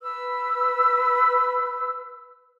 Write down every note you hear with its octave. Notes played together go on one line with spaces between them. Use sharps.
B4 E6